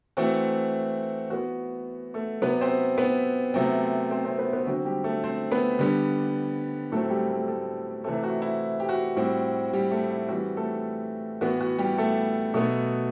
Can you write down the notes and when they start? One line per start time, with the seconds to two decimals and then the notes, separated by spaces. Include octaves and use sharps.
0.17 E3 A3 C4 F#4
1.29 E3 B3 F#4
2.14 A3 A4
2.42 C3 F#3 B3 B4
2.61 C4 C5
2.98 B3 B4
3.54 C3 F#3 A3 C4
4.11 C4 C5
4.24 C4 C5
4.39 B3 B4
4.53 B3 B4
4.66 D3 F#3 C4 F#4
4.85 G3 G4
5.04 A3 A4
5.24 C4 C5
5.52 B3 B4
5.79 D3 G3 B3
6.91 A2 F#3 A3 C4 A4
7.10 G3 G4
7.30 A3 A4
7.48 A3 A4
8.04 C3 E3 A3 C4 A4
8.23 F#4
8.42 E4
8.80 G4
8.89 F#4
9.16 A2 G3 C4
9.73 G3 G4
9.91 A3 A4
10.11 E4
10.29 E3 G3 C4 F#4
10.57 A3 A4
11.41 A2 E3 B3 F#4
11.61 F#4
11.78 G3 G4
11.98 A3 A4
12.54 B2 F#3 A3 B3 A4